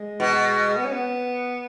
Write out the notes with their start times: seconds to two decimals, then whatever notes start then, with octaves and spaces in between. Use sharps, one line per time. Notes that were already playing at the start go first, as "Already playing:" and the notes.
Already playing: G#3
0.20 B2
0.77 B3
0.84 C#4
0.92 B3